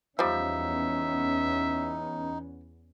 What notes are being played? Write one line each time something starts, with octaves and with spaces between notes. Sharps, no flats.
E2 F3 G3 B3 C#4 D#4 E5